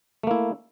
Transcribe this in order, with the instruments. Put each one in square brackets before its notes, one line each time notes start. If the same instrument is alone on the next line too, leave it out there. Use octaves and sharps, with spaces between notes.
[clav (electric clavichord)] A3
A#3
E4